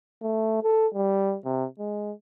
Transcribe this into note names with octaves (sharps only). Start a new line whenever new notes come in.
A3
A4
G3
C3
G#3